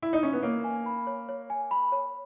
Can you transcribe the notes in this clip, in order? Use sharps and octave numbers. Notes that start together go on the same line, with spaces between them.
E4
D#4
C#4
B3
A#3 C#5
G#5
B5
C#5
C#5
G#5
B5
C#5